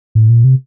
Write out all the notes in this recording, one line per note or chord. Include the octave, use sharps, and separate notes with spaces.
A2
A#2
C3